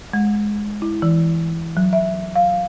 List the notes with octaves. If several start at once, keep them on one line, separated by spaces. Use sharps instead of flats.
G#3
E4
E3
F#3
E5
F5